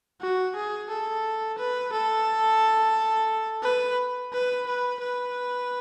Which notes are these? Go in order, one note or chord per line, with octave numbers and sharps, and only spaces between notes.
F#4
G#4
A4
B4
A4
B4
B4
B4
B4